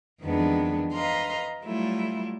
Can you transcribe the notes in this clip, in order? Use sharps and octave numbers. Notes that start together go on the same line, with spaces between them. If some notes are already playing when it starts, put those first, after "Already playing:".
F2 D#3 E3 G#3 B3 D4
B4 D#5 F5 A#5 C6
F#3 G3 A3 E4 F4